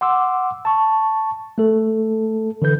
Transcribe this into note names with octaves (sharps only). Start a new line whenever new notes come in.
F#5 C6 D6 E6
A5 C#6
A3 A4
D3 E3 A4 B4 G6